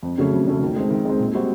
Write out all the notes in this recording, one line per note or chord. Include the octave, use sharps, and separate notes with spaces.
F2
C#3 F#3 A3 C#4
F2
C#3 F#3 A3 C#4
D#3
G#3 C4
D#3
G#3 C4
A#2
G3 C4 D#4 F#4